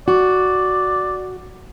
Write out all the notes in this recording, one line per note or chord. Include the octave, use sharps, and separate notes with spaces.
F#4 D5